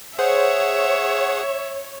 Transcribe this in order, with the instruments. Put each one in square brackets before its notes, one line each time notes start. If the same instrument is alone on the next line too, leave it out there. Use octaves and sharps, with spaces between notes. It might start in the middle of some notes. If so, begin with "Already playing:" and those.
[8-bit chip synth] G#4 F#5 [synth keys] C5 [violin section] C#5 [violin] E5